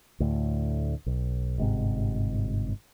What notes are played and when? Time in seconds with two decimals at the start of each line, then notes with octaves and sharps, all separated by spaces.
0.20 D2 A2
1.06 B1
1.58 G1 G#2 C3